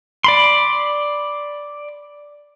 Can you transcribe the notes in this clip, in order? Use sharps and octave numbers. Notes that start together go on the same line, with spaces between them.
D5 B5 C6